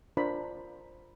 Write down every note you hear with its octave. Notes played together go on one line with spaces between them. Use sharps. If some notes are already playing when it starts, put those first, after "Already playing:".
D4 F4 A#4 C5 B5